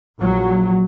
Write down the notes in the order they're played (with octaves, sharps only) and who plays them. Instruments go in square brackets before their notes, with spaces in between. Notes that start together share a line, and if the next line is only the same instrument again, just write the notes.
[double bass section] A#1 F#3